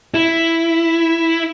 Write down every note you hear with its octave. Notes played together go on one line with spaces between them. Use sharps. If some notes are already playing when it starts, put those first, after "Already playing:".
E4